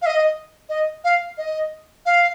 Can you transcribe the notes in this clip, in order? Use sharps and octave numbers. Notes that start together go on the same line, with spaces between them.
F5
D#5
D#5
F5
D#5
F5